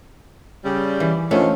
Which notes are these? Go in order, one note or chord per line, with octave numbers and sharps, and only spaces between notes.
C#3 G3
E3
D3 D#3 F3 A3 C#4